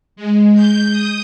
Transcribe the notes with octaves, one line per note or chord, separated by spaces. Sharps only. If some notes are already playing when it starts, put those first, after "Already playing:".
G#3
G6
D#6